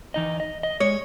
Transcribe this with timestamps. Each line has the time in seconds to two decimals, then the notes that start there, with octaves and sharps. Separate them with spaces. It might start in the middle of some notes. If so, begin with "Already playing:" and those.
0.14 E3 D#4 D#5
0.40 D#5
0.63 D#5
0.80 G#3 C#5